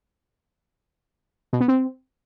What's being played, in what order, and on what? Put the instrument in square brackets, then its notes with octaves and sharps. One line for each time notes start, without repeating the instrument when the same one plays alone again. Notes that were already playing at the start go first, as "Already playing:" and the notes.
[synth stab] B2
B3
C4